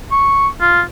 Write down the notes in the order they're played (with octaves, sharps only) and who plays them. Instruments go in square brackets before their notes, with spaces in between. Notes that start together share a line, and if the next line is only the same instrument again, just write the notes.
[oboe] C#6
F4